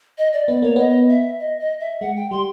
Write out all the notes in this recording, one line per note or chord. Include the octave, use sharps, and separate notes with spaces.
D#5
D5
B3 D5
A#3 C#5
B3 D#5
E5
D#5
D#5
E5
G#3 F#5
G5
G3 C6